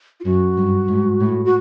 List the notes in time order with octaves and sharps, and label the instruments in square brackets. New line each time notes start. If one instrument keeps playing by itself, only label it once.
[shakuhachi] F4
[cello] F#2 [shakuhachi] F#4
[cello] G2
G#2
A2
[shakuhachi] F#4